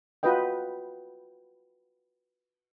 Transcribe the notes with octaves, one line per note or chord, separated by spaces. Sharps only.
F4 F#4 B4 D#5 G5